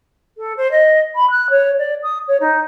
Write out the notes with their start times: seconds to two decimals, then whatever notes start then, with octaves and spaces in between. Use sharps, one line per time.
0.37 A4
0.57 C5
0.71 D#5
1.15 B5
1.30 F#6
1.50 C#5
1.79 D5
2.03 D#6
2.28 C#5
2.40 D#4